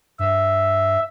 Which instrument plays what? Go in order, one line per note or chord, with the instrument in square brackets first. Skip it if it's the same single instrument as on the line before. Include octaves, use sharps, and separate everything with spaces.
[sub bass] G2 [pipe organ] E5